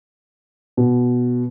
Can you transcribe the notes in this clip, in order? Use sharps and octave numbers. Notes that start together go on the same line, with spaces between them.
B2